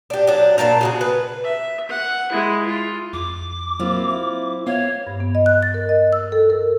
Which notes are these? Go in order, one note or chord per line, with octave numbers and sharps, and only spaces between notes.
D4 G4
F#3 D4
A#2 D4 A5 A#5
C#3 F#4 G#4
B4
E5
F#5
G#3 E4
F4
F2 D6
F#3 A#3 C4 E4 F4
E5
B3 C#5 E5 F5
G2
B3
D#5
F#6
A6
A#4
D#5
E6
A4
A#4